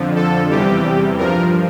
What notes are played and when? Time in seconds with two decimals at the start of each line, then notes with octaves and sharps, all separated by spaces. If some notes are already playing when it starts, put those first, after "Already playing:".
Already playing: F2 D3 F3
0.15 A4
0.50 E2 C3 E3 G3 G4
1.18 G2 F3 A#4